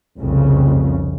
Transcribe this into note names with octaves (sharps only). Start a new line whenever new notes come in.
F1 C2 F2 C#3